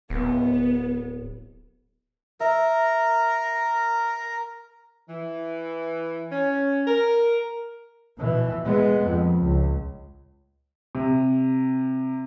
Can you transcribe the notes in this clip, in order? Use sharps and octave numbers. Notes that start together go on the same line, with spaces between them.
D1 B3
A#4 E5 E7
E3
C#4
A#4
B2 E3
G#3 B3
F2
C#2
C3